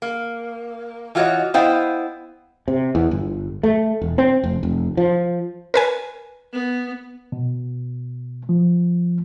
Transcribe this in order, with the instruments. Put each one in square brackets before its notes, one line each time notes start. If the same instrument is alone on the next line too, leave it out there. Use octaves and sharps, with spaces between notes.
[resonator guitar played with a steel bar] A#3
E3 F4 F#4 G#4 C#5 D#5
B3 E4 C5 D#5 F5 G5
[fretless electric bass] C3
E2
G1
A3
E1
C4
F1
F1
F3
[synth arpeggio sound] A#4 B4 G#5
[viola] B3
[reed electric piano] B2
F3